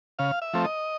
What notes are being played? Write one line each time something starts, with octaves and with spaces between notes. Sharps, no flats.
C#3 F5
E5
F3 A3 C4
D#5